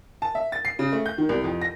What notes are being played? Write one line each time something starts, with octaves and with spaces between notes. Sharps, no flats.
A5
E5
A6
C7
C#3
A3
G6
D#3
C2
F2
A#6